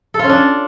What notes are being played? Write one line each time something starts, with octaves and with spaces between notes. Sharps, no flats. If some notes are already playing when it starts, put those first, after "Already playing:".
A4
F4
C#4
D4